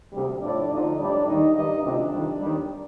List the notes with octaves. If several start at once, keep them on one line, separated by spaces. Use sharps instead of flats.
D2 C3 G3
A2 F3 D4 D5
D2 D3 F3 D#4 D#5
A2 G3 D4 D5
D#2 D#3 G3 D#4 D#5
G2 D#3 G3 D#4 D#5
D2 C3 F3 D4 D5
F2 D#3 G3
D#2 D#3 G3